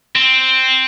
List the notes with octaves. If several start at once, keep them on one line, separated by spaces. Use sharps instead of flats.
C4